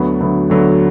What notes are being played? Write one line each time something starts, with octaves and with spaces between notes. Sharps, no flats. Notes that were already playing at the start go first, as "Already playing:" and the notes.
Already playing: D2 D3 F#3 B3
D2 D3 F#3 B3
D2 D3 F#3 B3